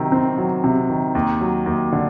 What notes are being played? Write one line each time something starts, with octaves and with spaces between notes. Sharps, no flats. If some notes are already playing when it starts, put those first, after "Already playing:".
Already playing: C3 D#3 F#3
C4
F#3
C3
D#3
D#2
F#3
D#2
D3